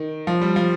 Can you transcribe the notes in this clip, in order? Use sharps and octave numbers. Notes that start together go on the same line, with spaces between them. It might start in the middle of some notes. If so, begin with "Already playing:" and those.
Already playing: D#3
F3
G3
F3